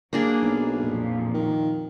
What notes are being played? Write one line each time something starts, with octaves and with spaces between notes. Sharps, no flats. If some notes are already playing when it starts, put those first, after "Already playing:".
F#3 A#3 D4 G#4
B1
F2 A#2 F3
D#3